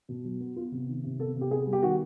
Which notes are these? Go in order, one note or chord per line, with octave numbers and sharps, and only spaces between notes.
B2
F#3
B3
B3 F4
C3
D#3
C3
B3 A4
C3
G4
B3 G#4
G3
G4
D#3 F#4